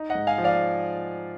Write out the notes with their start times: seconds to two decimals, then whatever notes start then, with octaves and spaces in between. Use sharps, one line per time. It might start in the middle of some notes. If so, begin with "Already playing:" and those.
Already playing: D#4
0.10 D#5 F#5
0.15 G#2
0.27 F5 G#5
0.38 F3
0.44 D5 F5